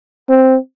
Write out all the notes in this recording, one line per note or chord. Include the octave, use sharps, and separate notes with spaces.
C4